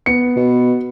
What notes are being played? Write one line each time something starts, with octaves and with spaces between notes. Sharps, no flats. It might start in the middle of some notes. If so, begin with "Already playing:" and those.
B3 C#7
B2